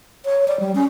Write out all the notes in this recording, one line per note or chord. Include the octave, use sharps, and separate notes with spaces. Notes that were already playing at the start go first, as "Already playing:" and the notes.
C#5
D5
G3
C#4